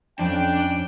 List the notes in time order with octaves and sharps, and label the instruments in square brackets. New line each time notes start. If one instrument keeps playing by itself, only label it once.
[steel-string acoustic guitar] F2 [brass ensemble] C#4 G5 [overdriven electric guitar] D4